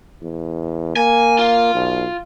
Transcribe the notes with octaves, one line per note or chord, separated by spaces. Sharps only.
E2
A#3 G#5
F4
B1